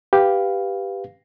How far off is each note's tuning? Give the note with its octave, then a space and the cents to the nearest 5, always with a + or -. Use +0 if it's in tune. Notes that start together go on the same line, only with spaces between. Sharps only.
G4 +0 B4 +0 F5 +0